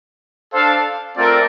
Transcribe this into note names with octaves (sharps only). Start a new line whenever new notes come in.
D4 A4 C5 F5
A3 C4 F4 A#4 D5